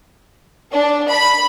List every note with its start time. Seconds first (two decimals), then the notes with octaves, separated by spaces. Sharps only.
0.71 D4
1.10 B5